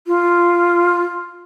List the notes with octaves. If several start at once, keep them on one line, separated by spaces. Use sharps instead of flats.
F4